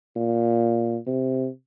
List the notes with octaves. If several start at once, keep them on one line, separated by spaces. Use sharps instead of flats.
A#2
C3